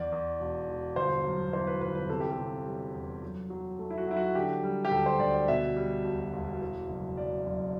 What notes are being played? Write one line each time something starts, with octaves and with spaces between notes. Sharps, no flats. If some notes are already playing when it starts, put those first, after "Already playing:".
Already playing: E2 D5
E2
E1
E1
G1 C5
F#2
E3 C5
B4
G1 B4
B4
C3 A4
G4
A4
C3
G3
E2
F#2
F#3
A3
E4
F#4
F#3 E4
F#4
D3 G4
G3
G4
D2 A4
C5
D2 D5
D5
B2 E5
G3
E1
E1
E3
F#1
F#2 D5
F#1